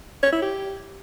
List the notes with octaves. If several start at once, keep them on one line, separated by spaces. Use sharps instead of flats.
C#5
E4
G4